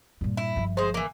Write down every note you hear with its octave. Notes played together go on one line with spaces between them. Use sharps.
G2 A#2
E4
G1 F3
G#3 C5
E3 A#3